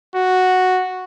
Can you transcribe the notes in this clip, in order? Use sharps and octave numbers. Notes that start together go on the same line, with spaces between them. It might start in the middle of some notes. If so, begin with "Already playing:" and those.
F#4